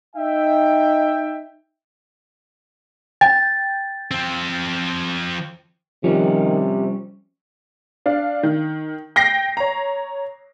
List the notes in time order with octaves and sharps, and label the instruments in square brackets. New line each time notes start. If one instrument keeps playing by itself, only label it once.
[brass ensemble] D#4 E5 G5
[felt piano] G5 [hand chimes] A6
[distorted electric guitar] F3 C4
[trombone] C3 [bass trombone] D#3 [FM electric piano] F3 [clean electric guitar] G3 C#4
[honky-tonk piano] D4 F5
D#3
G5 A#6 C7
C#5 A#5